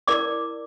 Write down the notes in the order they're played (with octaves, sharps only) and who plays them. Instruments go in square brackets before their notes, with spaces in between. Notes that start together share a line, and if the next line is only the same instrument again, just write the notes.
[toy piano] E4 A#4 D5 D6